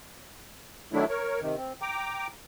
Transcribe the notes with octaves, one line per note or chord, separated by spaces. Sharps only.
D#3 F#3 A3 D4 E4
A#4 C#5
C3 D#3
C4
G5 A#5 D6